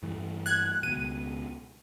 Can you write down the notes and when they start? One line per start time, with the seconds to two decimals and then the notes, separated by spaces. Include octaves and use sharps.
0.03 G2 E3 A3
0.46 F#6 G#6
0.83 C#2 B2 D#7